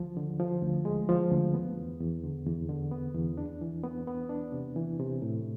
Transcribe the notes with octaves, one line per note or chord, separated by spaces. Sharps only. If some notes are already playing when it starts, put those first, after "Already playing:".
Already playing: D2 F3
D3
F3
D2
G#3
F3
D2
B3
E2
E2
D3
E2
D3
B3
E2
D4
E3
B3
B3
D4
C3
E3
C3
A2